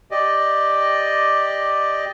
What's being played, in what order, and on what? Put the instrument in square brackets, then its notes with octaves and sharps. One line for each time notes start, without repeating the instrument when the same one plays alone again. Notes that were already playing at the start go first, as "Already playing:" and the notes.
[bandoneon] G4 D5 D#5